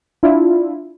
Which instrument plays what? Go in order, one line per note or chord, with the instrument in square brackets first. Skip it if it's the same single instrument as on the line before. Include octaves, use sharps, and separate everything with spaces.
[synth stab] D4 E4 F4